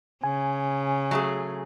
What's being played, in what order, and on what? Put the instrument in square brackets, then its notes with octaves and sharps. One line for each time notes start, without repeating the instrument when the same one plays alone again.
[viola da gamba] C#3 [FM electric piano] G#5
[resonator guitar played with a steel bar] F#3 A3 G#4